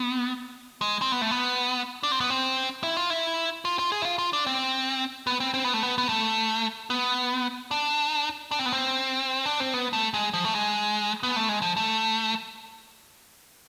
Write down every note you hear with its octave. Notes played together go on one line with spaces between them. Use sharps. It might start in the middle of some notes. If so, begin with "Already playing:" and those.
Already playing: B3
G#3
C4
B3
A3
B3
D4
C4
B3
C4
E4
F4
E4
F4
F4
G#4
E4
F4
F4
D4
C4
B3
C4
C4
B3
A3
B3
B3
A3
B3
D4
D4
C4
B3
C4
D4
C4
B3
A3
G#3
F3
A3
G#3
B3
A3
G#3
F3
A3